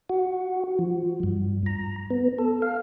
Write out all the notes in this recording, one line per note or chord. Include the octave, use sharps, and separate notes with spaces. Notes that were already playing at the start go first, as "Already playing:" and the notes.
F#4
F3
G2
A#5
B3
A4
F5